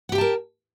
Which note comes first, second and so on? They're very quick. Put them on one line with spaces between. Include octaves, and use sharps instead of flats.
F#5 G4 G5 A5 A#4